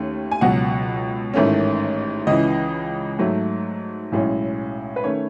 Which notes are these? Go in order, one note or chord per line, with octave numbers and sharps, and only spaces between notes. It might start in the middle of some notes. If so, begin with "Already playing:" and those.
Already playing: D#2 D#3 A3 C#4
G#5
C#2 B2 F#3 F#5
A1 G#2 D#3 A3 C#4
C#2 C#3 E3 D#5
G#2 F#3 A3
B1 A2 G#3 C#4
B4
D#3 A3 C#4 C#5